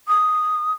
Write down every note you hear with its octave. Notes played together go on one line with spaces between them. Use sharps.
D#6